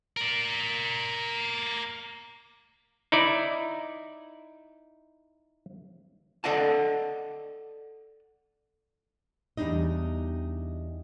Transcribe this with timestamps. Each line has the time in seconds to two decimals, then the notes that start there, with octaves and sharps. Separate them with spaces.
0.17 A#4 D5
3.12 D#4 E4 D5
6.44 A4 D5 D#5 F#5 A5
9.57 E2 G3 D4 D#4 D#5